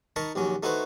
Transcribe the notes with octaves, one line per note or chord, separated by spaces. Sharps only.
D#4 A#4 A5 B5 C#6
A#1 D#2 F#3 C#4
A3 D#4 E4 F#4 B4 C5